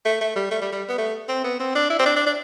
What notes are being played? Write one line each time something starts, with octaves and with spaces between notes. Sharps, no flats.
A3
A3
G3
A3
G3
G3
B3
A3
C4
B3
C4
D4
E4
C4
D4
D4
D4